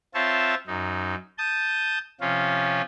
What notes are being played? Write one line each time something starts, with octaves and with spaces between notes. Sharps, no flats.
C4 F4 C#5 E5 A5
F#2 D#4
A5 D#6 G6
C3 F3 C#4 F4